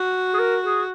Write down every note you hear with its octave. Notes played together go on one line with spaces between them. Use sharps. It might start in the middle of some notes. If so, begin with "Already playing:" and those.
Already playing: F#4
G#4
A#4
G#4